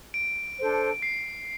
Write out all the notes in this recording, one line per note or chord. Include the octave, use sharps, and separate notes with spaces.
D7
D4 A4 C5
C7